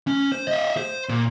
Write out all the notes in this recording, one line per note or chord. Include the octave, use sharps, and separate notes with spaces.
C#4
C5
D#5 E5
C5
A#2